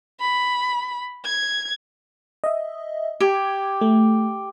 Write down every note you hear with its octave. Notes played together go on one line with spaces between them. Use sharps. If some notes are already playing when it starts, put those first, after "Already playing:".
B5
G#6
D#5 E5
G4 D6 G#6
A3